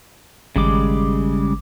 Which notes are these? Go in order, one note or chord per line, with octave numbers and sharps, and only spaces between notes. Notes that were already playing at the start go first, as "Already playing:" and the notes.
G#1 C#3 G3 G#3 D6